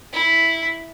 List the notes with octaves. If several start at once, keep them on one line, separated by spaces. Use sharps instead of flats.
E4